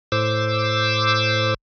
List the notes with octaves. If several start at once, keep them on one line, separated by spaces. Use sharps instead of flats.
A2 C5 D6 E6